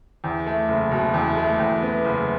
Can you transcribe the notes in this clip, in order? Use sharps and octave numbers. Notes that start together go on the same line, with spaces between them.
E2
A3
F#1
B2
E2
A3
E2
B3
F#1